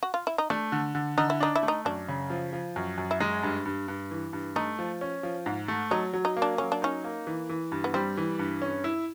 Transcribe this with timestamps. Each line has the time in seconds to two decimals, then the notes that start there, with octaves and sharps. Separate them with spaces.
0.03 F#4
0.14 F4
0.27 E4
0.38 D#4
0.50 A3 D4
0.72 D3
0.95 D3
1.17 D3 D#4
1.30 E4
1.40 D4 D#4
1.56 E4
1.63 A3
1.68 D#4
1.85 F#2 D4
2.08 C#3
2.30 F3
2.53 F3
2.76 F#2
2.98 F#2
3.11 E4
3.20 G#3 D#4
3.43 G2
3.65 G2
3.88 G2
4.11 E3
4.33 G2
4.56 A3 D#4
4.79 F3
5.01 C#4
5.23 F3
5.46 G#2
5.68 A3
5.91 F#3 D#4
6.14 F#3
6.25 D#4
6.37 A#3
6.42 D4
6.58 F#3 C#4
6.72 D4
6.82 C#4 D#4
7.04 A#3
7.27 E3
7.49 E3
7.72 G2
7.84 B3
7.94 G3 C4
8.17 E3
8.39 G2
8.62 C#4
8.84 E4